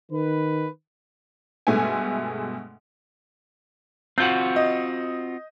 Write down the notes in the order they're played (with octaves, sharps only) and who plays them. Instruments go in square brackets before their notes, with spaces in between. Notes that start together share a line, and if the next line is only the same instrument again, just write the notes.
[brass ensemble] D#3 B4
[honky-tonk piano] G2 B2 G#3 A3 E5 G#5
[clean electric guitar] C4 F4 F#4 [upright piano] G6 F#7
[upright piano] D#5